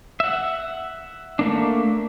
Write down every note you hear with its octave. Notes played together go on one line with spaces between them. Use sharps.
E5 F#5
A3 A#3 D4